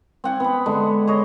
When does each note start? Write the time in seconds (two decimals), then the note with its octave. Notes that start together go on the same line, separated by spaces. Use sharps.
0.24 C4 F#5 G#5
0.40 B3 B5
0.66 D3 G#3
1.07 G#4 C#5 D#5